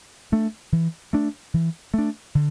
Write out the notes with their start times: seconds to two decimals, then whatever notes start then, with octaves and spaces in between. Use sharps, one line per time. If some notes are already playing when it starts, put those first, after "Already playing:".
0.32 A3 D4
0.72 E3
1.13 A3 D4
1.54 E3
1.94 A3 D4
2.35 D3